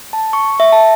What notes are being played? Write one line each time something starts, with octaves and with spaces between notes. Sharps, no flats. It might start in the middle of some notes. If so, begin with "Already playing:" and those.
A5
C#6
E5
A5